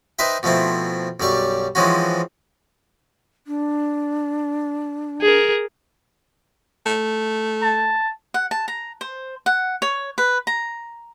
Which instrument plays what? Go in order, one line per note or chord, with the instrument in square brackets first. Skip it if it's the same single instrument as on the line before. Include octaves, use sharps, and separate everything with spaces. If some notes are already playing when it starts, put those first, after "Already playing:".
[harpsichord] D#4 B4 C5 E5 G5
B2 F3 A3 C4 E4
B1 F#2 G3 D5 C#6
E3 F3 G#3 C4 C#4 F#4
[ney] D4
[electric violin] G#4 A#4
[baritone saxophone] A3
[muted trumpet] A5
[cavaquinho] F#5
A5
A#5
C5
F#5
C#5
B4
A#5